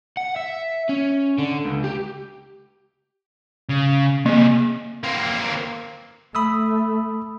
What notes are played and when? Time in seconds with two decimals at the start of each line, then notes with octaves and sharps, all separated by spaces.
0.17 F#5
0.36 E5
0.89 C#4
1.39 D3
1.65 C#2
1.84 G4
3.69 C#3
4.26 C3 A#3 G#4
5.03 A#3 C4
6.35 A3 B5 D#6 E6